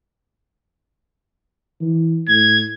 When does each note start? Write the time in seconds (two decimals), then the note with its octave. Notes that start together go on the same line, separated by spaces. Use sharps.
1.81 E3
2.29 A2 G#6